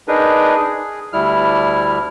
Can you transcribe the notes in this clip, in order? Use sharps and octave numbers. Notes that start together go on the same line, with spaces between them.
D4 D#4 G#4 A#4 B4
G#4
D2 G3 E4 F6